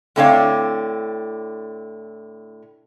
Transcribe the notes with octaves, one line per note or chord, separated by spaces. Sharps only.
A2 D3 C4 D4 C#5 F5